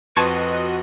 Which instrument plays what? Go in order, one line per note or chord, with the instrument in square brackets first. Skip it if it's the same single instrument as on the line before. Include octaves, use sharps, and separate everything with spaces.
[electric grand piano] F2 C6 [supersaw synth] F#4 D#5 [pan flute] B4 [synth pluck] A5 C#6 G#6